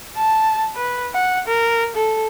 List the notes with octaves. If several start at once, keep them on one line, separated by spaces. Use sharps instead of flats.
A5
B4
F#5
A#4
A4